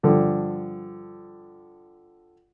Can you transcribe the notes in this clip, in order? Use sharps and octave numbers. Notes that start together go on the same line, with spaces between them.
G2 D3 F3